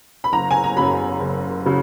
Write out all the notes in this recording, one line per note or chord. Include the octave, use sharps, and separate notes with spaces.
B5
F#1 A#5
G#5
A#5
F#2 C#3 F#3 B5
F#1
C#3 F#3